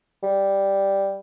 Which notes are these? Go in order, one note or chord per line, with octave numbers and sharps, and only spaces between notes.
G3